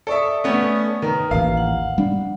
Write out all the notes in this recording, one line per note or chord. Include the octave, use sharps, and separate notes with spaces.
A4 D5 E5 C#6 D#6
A3 B3 C#4
D#3 B4 A#5
A1 D#2 F5
F#5
G3 D4